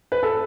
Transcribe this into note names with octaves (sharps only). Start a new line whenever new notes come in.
B4
A4